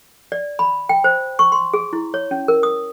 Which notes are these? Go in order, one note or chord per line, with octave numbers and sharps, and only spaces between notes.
D5
B5
G5
C5
C#6
C6
G#4
E4
C#5
C#4
A#4
D#6